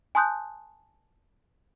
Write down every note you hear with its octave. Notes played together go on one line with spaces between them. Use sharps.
G#5 A5 C6 D#6 F#6 G6